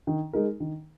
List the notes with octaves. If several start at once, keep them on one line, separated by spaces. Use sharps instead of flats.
D#3
G#3 D#4 A#4
D#3